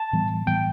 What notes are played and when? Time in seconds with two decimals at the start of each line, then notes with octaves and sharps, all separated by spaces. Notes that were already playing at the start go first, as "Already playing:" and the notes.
Already playing: A5
0.13 A2 E3 G3 B3
0.47 A2 E3 G3 B3 G5